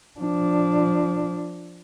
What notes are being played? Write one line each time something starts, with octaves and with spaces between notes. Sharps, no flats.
F3 D4